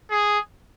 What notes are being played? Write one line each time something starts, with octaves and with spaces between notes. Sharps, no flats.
G#4